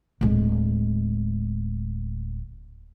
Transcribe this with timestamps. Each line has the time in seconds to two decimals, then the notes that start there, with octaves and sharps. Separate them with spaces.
0.21 D1 G#3